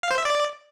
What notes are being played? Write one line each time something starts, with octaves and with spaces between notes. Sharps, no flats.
F5
C5
E5
D5